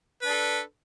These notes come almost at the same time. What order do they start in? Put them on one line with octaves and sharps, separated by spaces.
B4 D4 A4